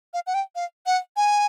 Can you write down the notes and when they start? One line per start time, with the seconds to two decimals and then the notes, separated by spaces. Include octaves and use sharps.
0.14 F5
0.27 F#5
0.34 G5
0.55 F5
0.86 F#5
1.16 G#5